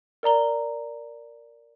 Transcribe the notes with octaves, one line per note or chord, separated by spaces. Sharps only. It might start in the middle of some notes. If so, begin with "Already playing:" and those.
A#4 D5 A#5 G7